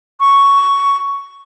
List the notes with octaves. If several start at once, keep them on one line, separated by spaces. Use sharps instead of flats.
C#6